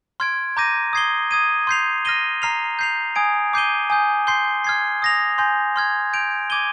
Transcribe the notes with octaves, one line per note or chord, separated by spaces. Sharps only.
C6 F6 G#6 D7
A#5 D6 G6 A#6 D#7
D#6 G#6 C7 G7
D#6 G#6 D#7
C6 G6 C7 F7
F6 A#6 D#7 G7
A#5 F6 C7 F7
G6 C7 F7
G#5 D#6 G#6 D7
D6 G6 C7 D#7 G7
G#5 D#6 G6
C6 G6 C7 G7
F6 G#6 C7
D#6 A#6 F7
G#5 C6 G6
C6 F6 G#6
G6 D7 F7
D6 G#6 D#7 G7